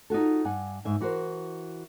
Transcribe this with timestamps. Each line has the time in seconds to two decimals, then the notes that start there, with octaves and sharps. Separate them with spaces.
0.10 D#4 F4 F#4 A4
0.45 G2 F#5 G#5
0.85 G#2 E5 G#5
1.00 E3 F#4 A#4 C5